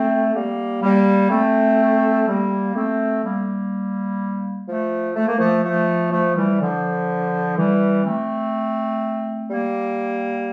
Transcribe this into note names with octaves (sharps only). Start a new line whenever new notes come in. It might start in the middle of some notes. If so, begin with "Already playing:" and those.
Already playing: A3 C4
G3 A#3
G3 A#3
A3 C4
G3 A#3
A3 C4
G3 A#3
F3 A3
A3
A#3
F3 A3
F3 A3
F3 A3
E3 G3
D3 F3
E3 G3
A3 C4
G3 A#3